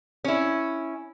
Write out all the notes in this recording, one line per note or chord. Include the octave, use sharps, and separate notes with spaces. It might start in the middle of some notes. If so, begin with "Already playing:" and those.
C#4 E4